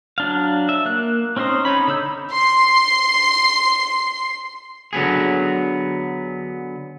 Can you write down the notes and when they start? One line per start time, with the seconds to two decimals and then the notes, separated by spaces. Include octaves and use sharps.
0.18 F#3 D4 F5
0.69 E5
0.85 A#3 F#6
1.37 C4 C#4 D#4 C5 D#5
1.65 D#4 C#5 B5
1.88 D3 B5 E6 G6
2.33 C6 C7
4.93 D3 F#3 B3 G#4